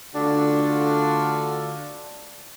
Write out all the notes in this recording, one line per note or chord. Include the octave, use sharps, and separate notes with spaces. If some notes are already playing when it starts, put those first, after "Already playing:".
D3 A3 D4 F4 F#4